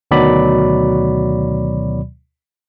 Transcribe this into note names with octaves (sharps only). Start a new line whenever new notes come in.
D2 B2 D#3 F#3 D5 B5